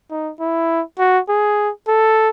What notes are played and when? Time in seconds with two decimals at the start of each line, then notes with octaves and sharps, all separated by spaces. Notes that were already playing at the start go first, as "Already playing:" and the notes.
0.11 D#4
0.40 E4
0.99 F#4
1.29 G#4
1.88 A4